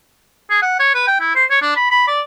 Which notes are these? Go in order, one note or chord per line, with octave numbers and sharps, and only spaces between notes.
G#4
F#5
C#5
B4
G5
E4
C5
C#5
D4
B5
B5
D5